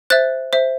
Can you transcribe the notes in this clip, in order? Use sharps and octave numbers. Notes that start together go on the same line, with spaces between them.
C5 E5 F#6 A6
C5 E5